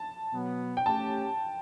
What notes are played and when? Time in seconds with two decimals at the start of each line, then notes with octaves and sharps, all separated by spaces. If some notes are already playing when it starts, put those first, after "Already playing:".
Already playing: A5
0.33 B2 F#3 B3
0.77 G5
0.86 A3 C#4 G4 A5